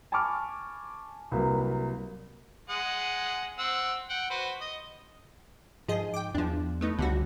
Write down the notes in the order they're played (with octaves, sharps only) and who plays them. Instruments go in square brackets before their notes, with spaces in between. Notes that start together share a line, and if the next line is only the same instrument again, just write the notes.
[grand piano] G#5 A5 B5 C#6 D6 F6
C2 F#3 A#3 B4
[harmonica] G#3 F#5 D#6
C4 F#5 E6
F#5 G5
F#4 B4 C5
D#5
[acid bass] G#2 [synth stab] F3 G#4 D#5
[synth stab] G5 D6
[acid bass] E2 [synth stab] F3 D4
[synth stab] A3 B3 D#4
[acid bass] C#2 [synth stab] D3 G3 F#4